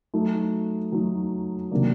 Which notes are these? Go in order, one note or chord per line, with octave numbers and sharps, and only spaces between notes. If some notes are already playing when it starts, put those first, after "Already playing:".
F#3 A3 D#4
F#3 A3 D#4
C3 D#3 F#3 A#3 D4